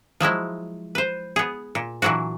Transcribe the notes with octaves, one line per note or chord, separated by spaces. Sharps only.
F3 F#3 G#3 E4
B4 C5
B3 G#4
A#2
A#2 E3 F#3 D4 F#4